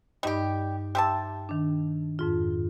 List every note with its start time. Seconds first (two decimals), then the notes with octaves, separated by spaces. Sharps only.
0.23 G2 G3 D#4 G4 D#5
0.95 G4 E5 A5 C6 E6
1.49 D#3 D4
2.19 F2 G#2 F4